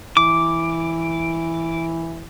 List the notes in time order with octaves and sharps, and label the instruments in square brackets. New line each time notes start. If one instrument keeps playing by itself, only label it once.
[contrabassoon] E3 [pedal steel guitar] D6